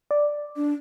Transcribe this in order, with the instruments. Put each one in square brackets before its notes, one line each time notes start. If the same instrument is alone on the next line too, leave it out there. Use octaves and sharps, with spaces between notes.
[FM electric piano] D5
[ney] D4